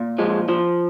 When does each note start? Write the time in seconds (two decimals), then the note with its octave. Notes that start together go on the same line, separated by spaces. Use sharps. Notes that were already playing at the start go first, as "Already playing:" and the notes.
Already playing: A#2
0.18 F3 G#3
0.49 F3